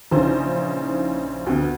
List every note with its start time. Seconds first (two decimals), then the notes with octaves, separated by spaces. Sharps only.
0.11 A#1 C#3 E3 D#4 C5
1.46 D2 B3